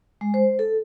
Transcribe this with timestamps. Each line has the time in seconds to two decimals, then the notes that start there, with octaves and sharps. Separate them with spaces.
0.21 G#3
0.34 C5
0.59 A4